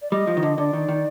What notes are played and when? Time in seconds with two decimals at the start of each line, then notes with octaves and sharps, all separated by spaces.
0.02 D5
0.11 G3 D#5
0.27 F3
0.37 D#3
0.43 D3
0.58 D3 D5
0.73 D#3
0.89 D#3